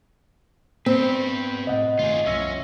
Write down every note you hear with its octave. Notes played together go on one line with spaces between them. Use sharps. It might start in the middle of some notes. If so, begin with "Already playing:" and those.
B3 C4 G4 B4
A2 C3 D#5 F#5
G1 D#3 A3 F4 G#4
C2 F#2 F3 C#4 E5 E6 A#6